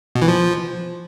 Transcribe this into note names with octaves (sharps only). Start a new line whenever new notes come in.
B2
E3
F3